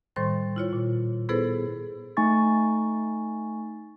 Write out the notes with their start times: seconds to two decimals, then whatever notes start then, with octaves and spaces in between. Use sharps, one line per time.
0.16 A2 D#3 G3 C5 C6 A6
0.56 E4 F4 C#5
0.73 A#2
1.29 B3 E4 G#4 A4 B4 C5
2.17 A3 D#4 G#5 C#6 A6